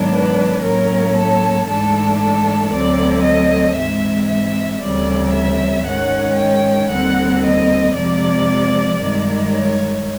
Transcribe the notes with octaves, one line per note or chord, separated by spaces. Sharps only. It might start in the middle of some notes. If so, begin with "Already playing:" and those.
Already playing: G#2 D#3 F#3 B3 D4
B4
A2 F#3 A#3 C#4 A#4
A4
G#2 E3 A3 D4 A4
A4
D2 D3 F#3 A3 C4 D5
D#5
G#2 E3 G#3 C4 E5
E5
D2 C#3 E3 G3 C4 D5
E5
G#2 D#3 G#3 C#4 F#5
G5
D#2 D3 G3 C4 F#5
D#5
F2 C3 F3 G#3 D5
G2 D#3 G#3
C#5